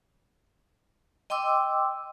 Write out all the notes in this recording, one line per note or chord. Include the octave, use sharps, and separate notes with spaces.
D#5 G5 C6 D6 E6